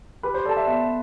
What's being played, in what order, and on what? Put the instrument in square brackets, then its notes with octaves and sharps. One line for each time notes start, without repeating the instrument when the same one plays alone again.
[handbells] G4 [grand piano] B4
[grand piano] C5
[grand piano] A4 [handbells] D5 A5
[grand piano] E5
[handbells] B3 [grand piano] E5